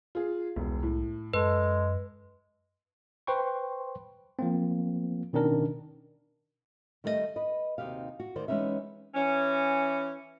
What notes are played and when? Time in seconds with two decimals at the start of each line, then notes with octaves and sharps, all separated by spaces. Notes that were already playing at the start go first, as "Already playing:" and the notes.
0.15 F4 G#4
0.56 E1 C2
0.83 A2
1.34 F#2 G#3 A4 B4
3.27 B4 C5 G5 C6 C#6
4.39 F3 A#3 C4
5.33 B2 D#3 C#4 D4 A#4
7.04 D#3 G3 A3 A4 C5 D#5
7.36 B4 D#5
7.78 D#2 C3 D#4 F#4 G4 F5
8.20 F#4
8.35 D2 D#3 C5 D5
8.48 E3 G#3 B3 C#4 D#4 E5
9.15 E3 C#4